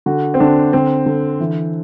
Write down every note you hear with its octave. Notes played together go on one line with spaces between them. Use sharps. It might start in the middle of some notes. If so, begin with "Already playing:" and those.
D3 F#4
C4
D3 D4
D3 C4
D3
E3